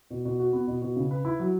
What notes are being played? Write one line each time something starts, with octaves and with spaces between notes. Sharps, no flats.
B2
B2
F#4
B3
B2
B2
C#3
B4
E4
F#3